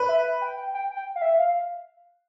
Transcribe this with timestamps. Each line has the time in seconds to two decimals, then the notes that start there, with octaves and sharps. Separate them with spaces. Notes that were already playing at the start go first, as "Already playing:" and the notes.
Already playing: B4
0.09 E5
0.42 G5
0.57 G5
0.74 G5
0.90 G5
1.16 F5
1.22 E5
1.39 F5